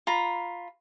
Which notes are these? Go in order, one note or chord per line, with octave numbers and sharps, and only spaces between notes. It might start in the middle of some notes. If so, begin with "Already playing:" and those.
F4 A#5 B5